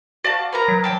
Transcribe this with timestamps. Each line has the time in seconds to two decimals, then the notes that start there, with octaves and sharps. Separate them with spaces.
0.24 F#4 D5 F5 A5
0.53 B3 A#4 A#5
0.68 F#3
0.84 D4 G5 A5